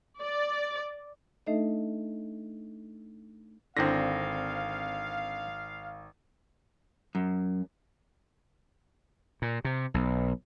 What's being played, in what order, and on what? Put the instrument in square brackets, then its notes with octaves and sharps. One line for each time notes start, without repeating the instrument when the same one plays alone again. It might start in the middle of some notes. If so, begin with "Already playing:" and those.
[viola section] D5
[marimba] A3 D4 D#4 A4 D#5 E5
[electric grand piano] G#1 A#6 [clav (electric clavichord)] D3 C4 [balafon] D4 E4 [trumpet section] F5
[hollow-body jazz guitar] F#2
[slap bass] A#2
C3
B1